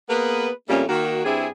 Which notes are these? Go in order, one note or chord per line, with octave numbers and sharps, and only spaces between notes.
A#3 B3 G#4 B4
F2 C#3 G3 A3 A#3 C#4
D#3 A#3 F#4
G2 G3 C4 E4 G#4